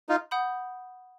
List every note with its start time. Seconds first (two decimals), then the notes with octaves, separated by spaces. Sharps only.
0.09 D#4 F4
0.31 F#5 B5 D#6 G6